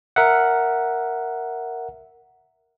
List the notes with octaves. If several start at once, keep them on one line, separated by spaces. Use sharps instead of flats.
A#4 E5 F#5